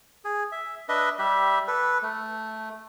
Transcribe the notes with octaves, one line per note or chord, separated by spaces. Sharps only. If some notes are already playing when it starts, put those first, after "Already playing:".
G#4
E5
D4 B4 D#5 E5
G3 G4 E5
A4 B4
A3